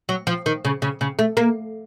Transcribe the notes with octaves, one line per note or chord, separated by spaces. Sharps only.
F#3
F3
D#3
C#3
C#3
C#3
A3
A#3